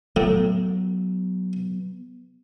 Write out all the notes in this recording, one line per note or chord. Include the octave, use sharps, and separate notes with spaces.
A2 F#3 B3